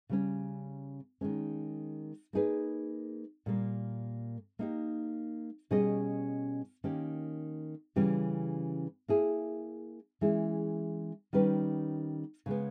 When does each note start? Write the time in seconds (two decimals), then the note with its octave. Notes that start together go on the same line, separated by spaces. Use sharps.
0.09 C#3 G3 C#4
1.21 D#3 G#3 C#4
2.33 A#3 D#4 G#4 B4
3.46 A#2 G3 A#3
4.59 A#3 D#4 G4
5.71 B2 G3 C#4 G#4 D#5
6.84 D#3 A#3 C#4 G4
7.96 C#3 E3 G3 C#4 G4
9.08 A#3 E4 G#4
10.21 E3 G#3 C#4 E4 G#4
11.33 D#3 G3 C#4 G4 B4
12.46 C#3 G#3 B3